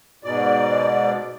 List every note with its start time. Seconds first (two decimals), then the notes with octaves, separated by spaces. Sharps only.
0.24 G#2 B2 D5